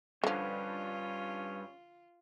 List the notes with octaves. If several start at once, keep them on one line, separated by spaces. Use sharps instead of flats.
G2 D3 F3 C#4 F4